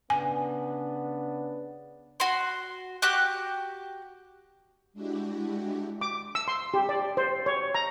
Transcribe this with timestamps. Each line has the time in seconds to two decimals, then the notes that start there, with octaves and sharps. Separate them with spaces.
0.10 C#3 B3 D4 G#5
2.20 F#4 C6
3.02 F#4 G4 D6 F#6
4.93 G#3 D4 E4 F#4 G4
6.01 D6
6.35 E6
6.48 C6
6.74 G4
6.89 D5
7.17 C5
7.46 C#5
7.75 A#5